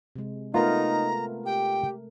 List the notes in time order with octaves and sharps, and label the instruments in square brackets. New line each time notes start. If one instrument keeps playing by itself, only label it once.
[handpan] C3 G#3
[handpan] A3 A#4 [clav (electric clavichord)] B3 F4 [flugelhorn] D#4 [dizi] A#5
[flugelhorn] G4 [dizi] G5